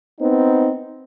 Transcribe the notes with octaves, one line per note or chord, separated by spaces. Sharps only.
B3 C4 D#4